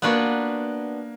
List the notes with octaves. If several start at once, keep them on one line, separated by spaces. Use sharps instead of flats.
A#3 B3 D4 F#4 B4